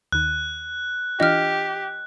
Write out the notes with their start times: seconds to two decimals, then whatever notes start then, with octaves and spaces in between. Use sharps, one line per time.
0.12 D#2 D#3 F#6
1.20 E3 D4 F4 G4 D#5 F6